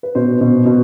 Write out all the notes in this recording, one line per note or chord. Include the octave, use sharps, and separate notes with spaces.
B4
B2 C5
B2
B2